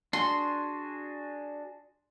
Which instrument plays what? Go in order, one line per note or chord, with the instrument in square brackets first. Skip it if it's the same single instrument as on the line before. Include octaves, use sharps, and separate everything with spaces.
[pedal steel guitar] D4 F#4 G#4 [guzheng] C6